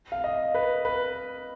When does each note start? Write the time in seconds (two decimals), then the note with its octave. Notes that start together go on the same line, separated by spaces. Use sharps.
0.12 F5
0.24 D#5
0.54 B4
0.85 B4